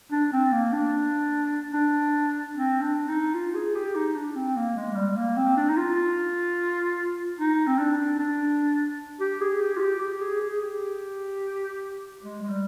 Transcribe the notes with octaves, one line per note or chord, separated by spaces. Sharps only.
D4
C4
A#3
D4
D4
C4
D4
D#4
F4
G#4
G4
D#4
D4
C4
A#3
G#3
G#3
G3
A#3
C4
D4
D#4
F4
D#4
C4
D4
D4
G4
G#4
G4
F4
G4
G4
G#4
G#4
G4
G#3
G#3
G3